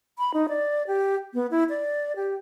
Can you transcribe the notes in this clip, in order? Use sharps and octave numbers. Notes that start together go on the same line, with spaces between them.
B5
D#4
D5
G4
B3
E4
D5
G4